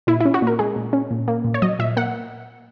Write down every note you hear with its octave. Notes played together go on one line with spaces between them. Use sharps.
A#2 E4
E4
C#4
F#4
A#2 A#4
G#3 G#4
A#2
C#4
A#2
A#3
A#2
C#5
F#3 D#5
A#2 E5
A#3 F#5